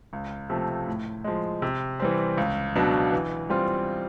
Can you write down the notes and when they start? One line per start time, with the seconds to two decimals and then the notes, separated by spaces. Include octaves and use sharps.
0.13 C#2
0.50 C3 F3 A3
0.87 A2
1.24 F3 G#3
1.62 C3
2.00 E3 G3 C4
2.38 C#2
2.75 B2 F#3 B3 D4
3.12 E3
3.50 G3 C4 F4